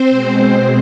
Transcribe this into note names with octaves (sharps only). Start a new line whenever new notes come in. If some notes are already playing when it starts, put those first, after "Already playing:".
Already playing: C4 C5
B2 G#3